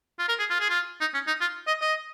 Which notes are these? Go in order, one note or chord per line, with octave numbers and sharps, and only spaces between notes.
F4
A#4
G#4
F4
G#4
F4
D#4
C#4
D#4
F4
D#5
D#5